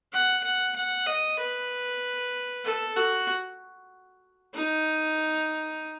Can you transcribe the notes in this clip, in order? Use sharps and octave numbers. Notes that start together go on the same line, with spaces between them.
F#5
F#5
F#5
D#5
B4
A4
F#4
D#4